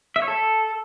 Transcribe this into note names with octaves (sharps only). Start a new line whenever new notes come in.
E5
C#5
A4